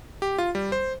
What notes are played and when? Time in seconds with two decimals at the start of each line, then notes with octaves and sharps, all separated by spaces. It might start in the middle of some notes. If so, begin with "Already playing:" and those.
0.22 G4
0.38 F4
0.55 G3
0.72 C5